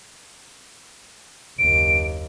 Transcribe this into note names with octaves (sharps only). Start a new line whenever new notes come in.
F#1 D#2 D7